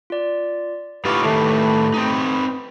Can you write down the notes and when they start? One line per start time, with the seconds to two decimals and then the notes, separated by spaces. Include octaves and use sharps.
0.10 F4 D5
1.05 A2 D#4 F4 G4 B4 C#6 D6
1.23 A2 D#3 A3
1.94 C4 D#4